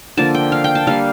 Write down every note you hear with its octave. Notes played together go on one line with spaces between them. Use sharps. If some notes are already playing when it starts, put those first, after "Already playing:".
D3 F3 A#3 A5
G5
F5
G5
A5
D3 G3 A#3 F5